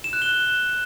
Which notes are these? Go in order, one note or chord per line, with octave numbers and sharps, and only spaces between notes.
E7
F#6
G7